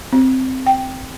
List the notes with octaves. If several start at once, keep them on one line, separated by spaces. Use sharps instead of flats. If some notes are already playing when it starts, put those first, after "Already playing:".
C4
G5